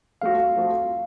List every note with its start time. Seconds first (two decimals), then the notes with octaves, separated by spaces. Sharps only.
0.22 F3 A3 C4 F#4 F5
0.57 F3 A3 C4 F#4